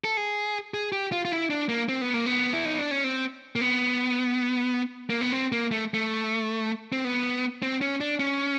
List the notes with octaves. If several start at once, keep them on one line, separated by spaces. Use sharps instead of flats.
A4
G#4
G#4
G4
F4
F4
E4
D4
A#3
C4
B3
A#3
B3
E4
D#4
D4
C#4
C4
A#3
B3
A#3
B3
C4
A#3
A3
A3
C4
B3
C4
C#4
D4
C#4